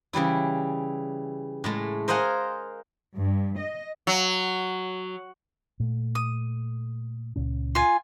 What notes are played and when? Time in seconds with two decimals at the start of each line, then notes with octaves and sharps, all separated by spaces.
0.13 C#3 E3 G3 E4
1.64 A2 G#3 A3
2.08 A#4 C5 D#5 F5 F#5 G#5
3.16 G2
3.59 D#5
4.07 F#3
5.80 A#2 A3
6.15 D#6
7.36 C#2 A#2 C#4
7.75 F4 G#5